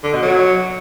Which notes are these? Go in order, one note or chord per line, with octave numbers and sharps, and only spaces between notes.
D3
B2
F#3